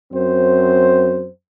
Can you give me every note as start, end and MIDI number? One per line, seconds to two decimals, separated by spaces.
0.12 1.28 42
0.12 1.28 60
0.12 1.28 72